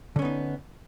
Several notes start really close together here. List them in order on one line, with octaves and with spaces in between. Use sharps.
D3 C#4 B3 D#4